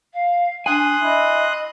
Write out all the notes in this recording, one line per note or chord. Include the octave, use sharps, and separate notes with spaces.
F5
D4 G#5 C6 D#6 F#6
E4 D#5